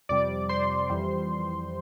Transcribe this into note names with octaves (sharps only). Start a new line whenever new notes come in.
F2 C3 G3 D5 D6
C5 C6
F2 E3 G3